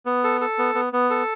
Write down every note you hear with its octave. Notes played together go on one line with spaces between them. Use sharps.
B3
A4
A4
B3
B3
B3
A4